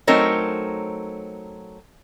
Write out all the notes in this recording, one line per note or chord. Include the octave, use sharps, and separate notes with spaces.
F#3 A3 C4 D#4 A#4 C#5